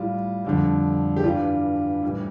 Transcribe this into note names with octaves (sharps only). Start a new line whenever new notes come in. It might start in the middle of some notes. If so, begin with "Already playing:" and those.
Already playing: A2 G3 F4
F2 D3 G3
G4
G2 E3 G3 F4
A2 E3 G3